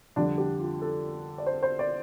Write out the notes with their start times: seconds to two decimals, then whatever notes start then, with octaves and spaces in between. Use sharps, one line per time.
0.16 F2 D3 G3 D4
0.38 G4
0.60 F4
0.81 A4
1.38 D5
1.46 C5
1.63 C5
1.79 D5